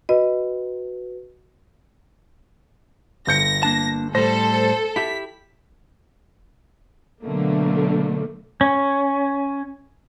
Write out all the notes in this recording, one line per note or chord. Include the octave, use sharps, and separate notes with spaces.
F#4 B4 D#5
G1 G6 A#6 C#7
A#3 D4 A5
A2 G3 A4 C5 A#6
E4 G4 E5 B6
B2 D3 F#3 A3 A#3
C#4